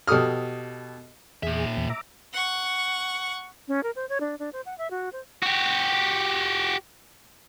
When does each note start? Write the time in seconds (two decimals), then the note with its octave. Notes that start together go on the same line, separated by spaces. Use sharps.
0.07 B2 G4 A4 D#6 F6
1.43 E2 A#2 G#4 E5
1.77 E2
1.90 E5 A#5 D6
2.34 F#5 C#6
3.68 C#4
3.83 A#4
3.96 C5
4.09 C#5
4.21 D4
4.39 D4
4.53 C5
4.66 F#5
4.78 E5
4.91 F#4
5.13 C5
5.43 F#4 G4